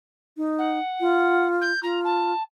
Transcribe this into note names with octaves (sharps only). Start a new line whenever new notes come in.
D#4
F#5
F4
G6
F4 A#5
A5